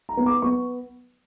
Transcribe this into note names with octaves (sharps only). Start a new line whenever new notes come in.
A#5
B3
D6
B3 C#6